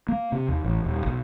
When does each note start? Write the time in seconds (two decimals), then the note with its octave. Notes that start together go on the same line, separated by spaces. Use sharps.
0.09 A#3
0.32 C3
0.49 D#2
0.64 A1
0.84 D#1
1.06 B1